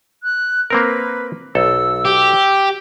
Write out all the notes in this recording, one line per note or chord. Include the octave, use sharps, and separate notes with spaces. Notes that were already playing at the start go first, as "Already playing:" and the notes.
F#6
A#3 C4 A#4 B4
B1 A4 E6
G4